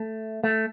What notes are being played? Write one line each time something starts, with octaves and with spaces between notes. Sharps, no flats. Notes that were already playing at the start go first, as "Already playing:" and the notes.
Already playing: A3
A3